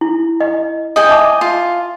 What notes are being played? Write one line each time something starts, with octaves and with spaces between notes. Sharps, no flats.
E4
D#5
D#5 G5 G#5
E5 A5 D6
F4